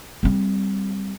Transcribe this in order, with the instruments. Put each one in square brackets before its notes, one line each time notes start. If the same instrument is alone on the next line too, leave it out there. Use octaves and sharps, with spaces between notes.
[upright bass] G3 C4